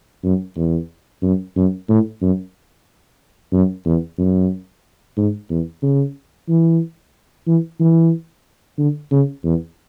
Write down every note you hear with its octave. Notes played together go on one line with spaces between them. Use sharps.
F#2
E2
F#2
F#2
A2
F#2
F#2
E2
F#2
G#2
E2
C#3
E3
E3
E3
D3
C#3
E2